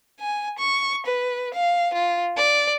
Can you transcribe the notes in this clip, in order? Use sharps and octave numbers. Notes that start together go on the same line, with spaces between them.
G#5
C#6
B4
F5
F4
D5